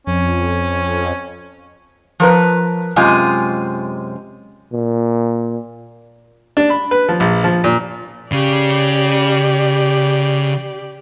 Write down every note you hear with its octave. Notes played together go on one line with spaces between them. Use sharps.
F2 C#4
F3 A#4 B4
F#2 C3 G#3 F4 D#5 G#5
A#2
D4
B5
B4
F3
A#1
F3
A#2
C#3 G4 D5